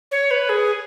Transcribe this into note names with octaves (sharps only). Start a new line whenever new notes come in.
C#5
B4
G#4